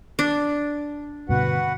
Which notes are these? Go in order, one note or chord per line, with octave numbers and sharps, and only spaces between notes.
D4
G2 B2 D3 F#4 B4 F#5